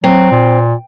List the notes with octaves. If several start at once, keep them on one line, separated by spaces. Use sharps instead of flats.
F#3 C4
A#2